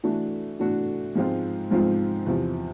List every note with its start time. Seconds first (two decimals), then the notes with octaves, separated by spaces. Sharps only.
0.04 E3 A3 D4 F#4
0.59 E3 A3 D4 F#4
1.15 G#2 F3 G#3 C4 F4
1.71 G#2 F3 G#3 C4 F4
2.26 E2 C3 F3